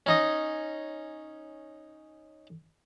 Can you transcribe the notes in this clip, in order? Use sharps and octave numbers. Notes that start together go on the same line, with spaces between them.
C#4 D#4 D#5